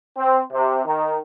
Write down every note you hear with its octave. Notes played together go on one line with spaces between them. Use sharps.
C4
C3
D#3